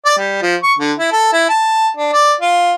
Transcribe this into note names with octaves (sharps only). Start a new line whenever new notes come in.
D5
G3
F3
C#6
D3
E4
A4
E4
A5
D4
D5
F4